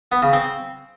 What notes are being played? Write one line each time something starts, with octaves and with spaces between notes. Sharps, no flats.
B3
C#3
C4